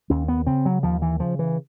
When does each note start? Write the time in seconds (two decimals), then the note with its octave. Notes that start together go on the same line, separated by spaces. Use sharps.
0.10 D#2 C#4
0.28 B3
0.47 C#3 C4
0.66 F#3
0.83 D#2 F3
1.02 E3
1.20 C#3 F3
1.39 E3